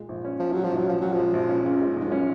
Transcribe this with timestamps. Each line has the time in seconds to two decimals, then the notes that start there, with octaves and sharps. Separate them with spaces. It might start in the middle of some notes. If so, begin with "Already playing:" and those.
Already playing: A#2 G#3
0.09 A#1
0.25 C#4
0.39 A#2 F3
0.52 F#3 G#3
0.64 F3
0.71 A#1
0.76 F#3
0.87 F3 C#4
1.01 A#2 F#3
1.13 F3 G#3
1.33 A#1
1.49 C#4
1.65 A#2 C#3
1.81 G#3
1.97 A#1 G#2
2.07 F#2 C#4